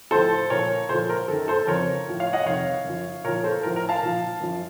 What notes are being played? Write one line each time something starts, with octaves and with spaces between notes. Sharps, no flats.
A2 F3 A4 C5
A#2 F3 A#4 C#5
A#2 F3 A4 C5
A#4
F#2 D#3 A4
A4 C5
F2 C#3 F3 A#4 C#5
A2 F3
C#5 F5
D#5 F#5
F2 C3 D#3 C#5 F5
F#2 F3
A#2 F3 A#4 C#5
A4 C5
A2 F3 A#4
A#4
F5 A5
A#2 F3
F#2 F3